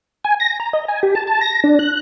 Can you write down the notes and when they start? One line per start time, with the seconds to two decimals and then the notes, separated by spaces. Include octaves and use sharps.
0.24 G#5
0.40 A#6
0.60 A#5
0.73 D#5
0.88 G#5
1.03 G4
1.15 A5
1.27 A5
1.41 A#6
1.64 D4
1.79 F#6